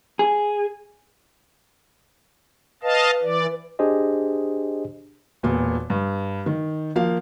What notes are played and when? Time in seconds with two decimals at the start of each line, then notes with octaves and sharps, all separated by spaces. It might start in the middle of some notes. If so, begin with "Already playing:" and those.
0.19 G#4
2.83 B4 D#5 F5 A5
3.23 E3 D5
3.79 D4 G4 G#4 C5 D#5
5.43 E1 A#2 B3
5.90 G2
6.46 D#3
6.96 F3 A#3 F5